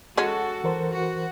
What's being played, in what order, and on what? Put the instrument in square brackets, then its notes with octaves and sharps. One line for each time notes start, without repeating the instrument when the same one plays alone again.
[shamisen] G#3 C#4 [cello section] F#4 A4
[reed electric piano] E3 A#4 C5
[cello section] F#4